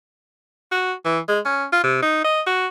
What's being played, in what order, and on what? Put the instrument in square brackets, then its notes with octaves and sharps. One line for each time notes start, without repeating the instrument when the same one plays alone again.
[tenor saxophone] F#4
E3
G#3
C#4
F4
C3
D#4
D#5
F#4